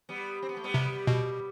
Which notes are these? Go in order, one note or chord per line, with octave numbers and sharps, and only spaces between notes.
G3 B3
C4
B3
A3
G3 B3
C3
B2